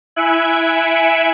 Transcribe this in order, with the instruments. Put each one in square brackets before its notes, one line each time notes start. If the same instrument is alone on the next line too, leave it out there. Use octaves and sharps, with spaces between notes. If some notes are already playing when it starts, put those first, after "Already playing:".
[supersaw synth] E4 E5 G#5 F#6 C#7 D7